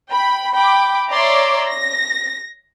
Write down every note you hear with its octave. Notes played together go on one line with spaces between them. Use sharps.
G5 B5
G5 B5 D6
C#5 D5 E5 A#5 C6 D6
A#6